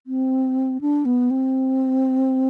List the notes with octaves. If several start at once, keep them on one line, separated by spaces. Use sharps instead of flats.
C4
D4
B3
C4